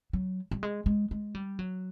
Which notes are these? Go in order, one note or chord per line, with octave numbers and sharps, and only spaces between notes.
F#3
G3
G#3
G#3
G#3
G3
F#3